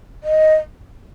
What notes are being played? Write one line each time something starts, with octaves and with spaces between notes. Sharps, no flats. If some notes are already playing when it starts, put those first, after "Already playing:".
D#5